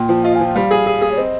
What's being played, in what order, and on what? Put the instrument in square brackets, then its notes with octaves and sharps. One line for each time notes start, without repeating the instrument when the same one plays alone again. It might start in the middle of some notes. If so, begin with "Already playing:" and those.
Already playing: [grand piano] A#2 [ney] G5
[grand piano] F3
[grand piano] F4 [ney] D#5
[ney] G#5
[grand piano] F3 [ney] G5
[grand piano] G3 [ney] F5
[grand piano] G#4
G#4
G#4
[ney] C#5
[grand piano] C4 [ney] D#5